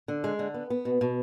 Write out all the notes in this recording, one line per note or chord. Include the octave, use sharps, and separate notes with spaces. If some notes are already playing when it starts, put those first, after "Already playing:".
D3
G#3
D3
B3
B3
B2
B2